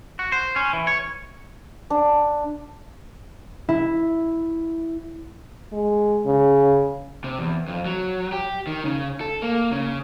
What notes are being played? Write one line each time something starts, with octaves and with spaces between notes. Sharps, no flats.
F#4
C5
C#4
E3
C#5
D4
E4
G#3
C#3
C3
E2
F2
F#3
G4
D#3
C#3
A4
A#3
C#3